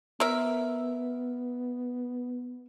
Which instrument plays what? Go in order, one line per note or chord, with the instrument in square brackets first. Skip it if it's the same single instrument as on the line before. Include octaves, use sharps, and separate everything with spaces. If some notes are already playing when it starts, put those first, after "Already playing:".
[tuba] B3 [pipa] A#4 E5